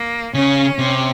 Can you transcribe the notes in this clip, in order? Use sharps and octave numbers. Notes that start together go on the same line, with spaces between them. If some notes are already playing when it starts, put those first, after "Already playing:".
Already playing: A#3
C#3 C#4
C3